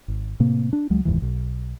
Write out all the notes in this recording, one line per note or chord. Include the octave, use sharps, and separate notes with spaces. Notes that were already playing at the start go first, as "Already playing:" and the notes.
G#1
A2 C3 A#3
D4
C#2 F#3 G#3
F1 D#2 G#2 E3
B1